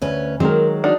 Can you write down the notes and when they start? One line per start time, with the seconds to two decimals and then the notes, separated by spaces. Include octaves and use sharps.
0.02 D2 C#4 B4
0.40 D#3 F#3 G#3 C4 A#4
0.84 D4 D#4 F#4